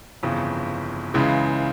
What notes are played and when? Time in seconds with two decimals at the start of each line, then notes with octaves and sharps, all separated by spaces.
0.23 G1 F2 C#3 E3
1.14 C#2 C#3 E3 G#3